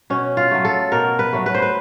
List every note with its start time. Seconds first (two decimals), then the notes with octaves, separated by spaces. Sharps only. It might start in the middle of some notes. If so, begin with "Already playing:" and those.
0.10 B2 C#4
0.37 F4
0.51 F#3 A3
0.65 A4
0.92 B2 A#4
1.19 B4
1.33 F#3 A3
1.46 B4
1.54 C5
1.62 B4